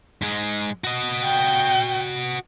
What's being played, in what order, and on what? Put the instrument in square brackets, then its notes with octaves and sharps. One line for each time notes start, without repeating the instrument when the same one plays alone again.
[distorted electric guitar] G#2 G#3
F#4 D#5
[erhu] G5